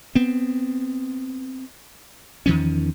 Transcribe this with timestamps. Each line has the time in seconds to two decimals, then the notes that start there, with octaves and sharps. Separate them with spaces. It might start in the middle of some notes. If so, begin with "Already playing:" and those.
0.15 B3 C4
2.46 E2 D#3 F3 C#4